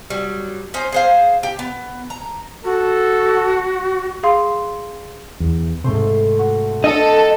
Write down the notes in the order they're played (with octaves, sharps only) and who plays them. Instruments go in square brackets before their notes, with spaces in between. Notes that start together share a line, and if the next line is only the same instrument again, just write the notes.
[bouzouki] F#3 G3
C#4 D#4 C5
G#4 C5 F5
G4
B3
A#5
[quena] F#4 [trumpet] A4
[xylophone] G#4 F5 C6
[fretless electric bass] E2
[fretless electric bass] G#2 C3 [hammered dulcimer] A3 C5
[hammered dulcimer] F#4
[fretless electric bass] D4 [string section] A4 [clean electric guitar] D#5